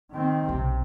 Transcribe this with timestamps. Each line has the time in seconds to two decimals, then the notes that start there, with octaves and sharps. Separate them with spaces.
0.11 D#3 C4
0.49 B1 C3